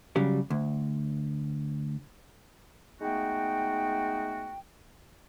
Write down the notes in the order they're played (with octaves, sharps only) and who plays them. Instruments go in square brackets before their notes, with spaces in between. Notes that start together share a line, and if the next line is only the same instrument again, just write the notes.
[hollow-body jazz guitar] C#3 F#3 G3
D2
[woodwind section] G#3 A3 B3 D#4 F#4 G5